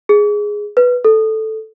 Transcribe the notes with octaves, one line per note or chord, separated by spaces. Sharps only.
G#4
B4
A4